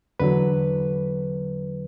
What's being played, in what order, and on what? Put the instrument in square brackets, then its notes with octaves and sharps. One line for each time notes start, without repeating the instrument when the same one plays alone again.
[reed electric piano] E2 D3 F#3 B4